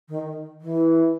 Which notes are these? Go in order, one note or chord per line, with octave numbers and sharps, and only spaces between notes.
D#3
E3